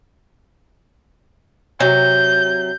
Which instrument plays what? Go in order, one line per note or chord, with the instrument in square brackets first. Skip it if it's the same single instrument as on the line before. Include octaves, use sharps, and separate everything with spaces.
[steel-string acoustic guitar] C3 F#3 [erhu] G6